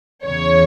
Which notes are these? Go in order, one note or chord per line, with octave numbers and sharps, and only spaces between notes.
E2 C#3 E3 C#5